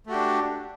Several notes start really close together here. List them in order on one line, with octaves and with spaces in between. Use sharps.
A3 F#4 G4 D4